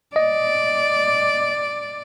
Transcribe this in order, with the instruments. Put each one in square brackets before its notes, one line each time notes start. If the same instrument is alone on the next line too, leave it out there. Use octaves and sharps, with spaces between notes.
[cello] D5 [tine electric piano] D#5